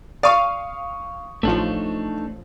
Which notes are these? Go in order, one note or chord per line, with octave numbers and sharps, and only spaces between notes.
D5 F5 C#6 D#6 D#7
A1 F3 A3 D4 D#4